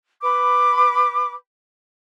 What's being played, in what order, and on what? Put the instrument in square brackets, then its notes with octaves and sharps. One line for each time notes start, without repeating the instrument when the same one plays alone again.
[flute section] B4 B5 D6